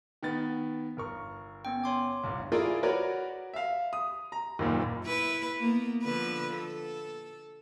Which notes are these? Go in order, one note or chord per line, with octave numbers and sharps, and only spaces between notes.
D#3 B3 A6
G1 A#4 C#6
B3 C#4 G5
C#5 C6 D6
G1 C2
E4 F4 G#4 A#4 D5
F#4 A#4 B4 C#5 D5
E5 F5
D#6
A#5
F#1 D#2 A#2
E4 B4
A#3 B3
D3 F3 B4
A4